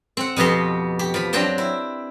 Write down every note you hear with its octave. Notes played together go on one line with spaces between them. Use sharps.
C4 F#5
F2 B2 B3 G4 C6
G4
F3 B5
F#3 C4 D4 G5 A5
E4